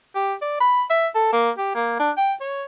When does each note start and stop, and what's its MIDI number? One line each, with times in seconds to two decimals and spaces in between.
0.15 0.34 67
0.42 0.57 74
0.60 0.83 83
0.90 1.08 76
1.15 1.30 69
1.33 1.51 58
1.58 1.73 67
1.75 1.99 58
1.99 2.11 62
2.17 2.34 79
2.41 2.65 73